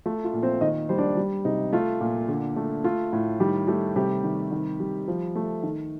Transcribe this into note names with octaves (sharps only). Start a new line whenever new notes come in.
A3 F4
F4
A#2
C4 C5
D#3 D#4 D#5
G3 C5
D4 D5
G3
C3 D#4
A3 F4
A#2
D3
A3
A3 F4
A2
D#3 G3 G4
G3 A3 G4
C3 G3 G4
D#3
D#3
G3
F3
A3
D#3